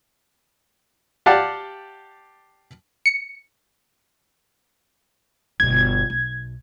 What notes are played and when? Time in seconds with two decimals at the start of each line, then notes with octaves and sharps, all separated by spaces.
1.26 G4 D5 F5 F#5 A5
3.06 C#7
5.60 G1 B2 G#6
6.10 B1